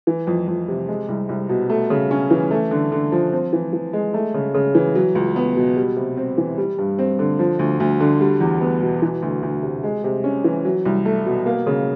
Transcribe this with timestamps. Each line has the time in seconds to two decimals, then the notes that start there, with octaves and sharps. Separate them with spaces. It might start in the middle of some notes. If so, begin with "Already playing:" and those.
0.07 E3
0.27 F2
0.48 F2
0.68 C3
0.88 G#3
1.08 C2
1.29 C2
1.49 B2
1.70 A3
1.90 C#3
2.11 C#4
2.30 E3
2.51 A3
2.71 D3
2.92 D3
3.12 F3
3.33 C4
3.53 E3
3.73 E3
3.93 G#3
4.14 A3
4.34 C#3
4.54 C#3
4.75 E3
4.95 F#3
5.15 C#2
5.36 B3
5.56 B2
5.76 G3
5.97 C3
6.17 C4
6.37 E3
6.58 G3
6.78 G2
6.99 C4
7.19 D3
7.39 F3
7.59 D2
7.80 D2
8.00 D3
8.21 G3
8.41 E2
8.61 B3
8.82 B2
9.02 E3
9.22 D2
9.42 D2
9.63 C3
9.83 G#3
10.04 C3
10.24 C#4
10.44 E3
10.65 F#3
10.85 C2
11.05 A3
11.26 B2
11.46 A#3
11.67 C#3